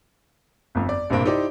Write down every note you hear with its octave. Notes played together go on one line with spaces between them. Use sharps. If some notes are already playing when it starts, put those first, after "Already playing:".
G1 F2
D5
A#1 G2 C3 A#3 C4 D7
D#4 E4 G4 C5 D5